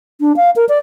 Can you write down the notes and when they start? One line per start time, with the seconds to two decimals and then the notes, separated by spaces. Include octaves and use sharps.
0.21 D4
0.36 F5
0.56 A#4
0.69 D5